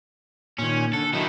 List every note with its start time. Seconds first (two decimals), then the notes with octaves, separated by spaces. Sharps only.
0.58 A#2 D#3 C#4
0.93 D3 A4
1.13 D#3 F#3 D#4 E4